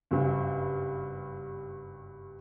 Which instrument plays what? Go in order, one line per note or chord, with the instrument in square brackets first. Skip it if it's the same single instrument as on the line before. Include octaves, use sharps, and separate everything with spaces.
[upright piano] F#1 G2